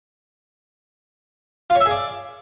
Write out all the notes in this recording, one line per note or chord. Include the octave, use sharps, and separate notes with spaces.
F4
C#5
E5
G#4
D5